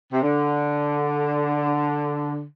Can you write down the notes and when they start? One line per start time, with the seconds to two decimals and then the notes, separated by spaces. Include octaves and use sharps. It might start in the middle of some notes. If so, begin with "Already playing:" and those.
0.13 C3
0.22 D3